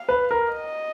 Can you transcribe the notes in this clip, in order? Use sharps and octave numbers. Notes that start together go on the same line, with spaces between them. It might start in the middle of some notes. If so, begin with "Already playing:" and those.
Already playing: F5
B4
A#4
D#5